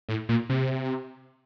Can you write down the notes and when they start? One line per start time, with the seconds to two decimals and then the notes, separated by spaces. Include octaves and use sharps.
0.09 A2
0.29 A#2
0.49 C3